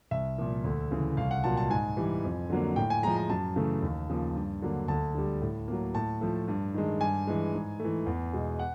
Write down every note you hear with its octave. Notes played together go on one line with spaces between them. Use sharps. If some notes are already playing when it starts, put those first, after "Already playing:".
C2 E5
A#2 F3 A#3
D2
C#3 E3
C2 F5
F#5
A#2 F#3 A#3 A5
A5
G#2 G#5
E3 G3
F2
D3 F#3 A#3
A2 G5
G#5
F3 G#3 A#5
A#5
F#2 A5
C#3 E3 A3
D#2
C#3 F3 A#3
G2
D3 F#3 A#3
D2 A5
D3 G3
A2
F#3 A#3
A2 A5
F3 A3
G2
D#3 G#3
G2 G#5
E3 G#3
G#2
E3 A3
E2
B2 G#3
F#5